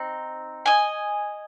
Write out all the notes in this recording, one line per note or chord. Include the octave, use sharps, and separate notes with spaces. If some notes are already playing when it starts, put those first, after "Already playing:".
Already playing: C4 D#4
D#5 G#5